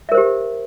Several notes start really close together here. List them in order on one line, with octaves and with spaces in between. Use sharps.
E5 A#4 C5 G4